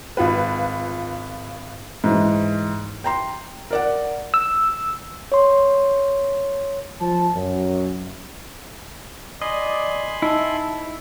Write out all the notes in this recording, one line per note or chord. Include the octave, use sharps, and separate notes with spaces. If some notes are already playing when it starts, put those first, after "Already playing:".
G#1 F4 B4
G#2 E3
G5 A#5 C6
A#4 D5 F#5
E6
C#5 C6
F3 C5 A5
F#2
D5 D#5 G#5 B5 C6
D#4 E4 E5 A5